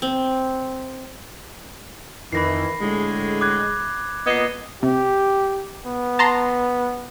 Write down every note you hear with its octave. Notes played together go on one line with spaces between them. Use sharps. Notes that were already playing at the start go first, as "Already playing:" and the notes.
C4
F2 D#3 E3 B5 A#6 C7
D1 A2 D3 G#3
D6 F#6 G#6
A#2 B3 D#5 G#6 C7
C3 G4
B3
A5 A#5 C6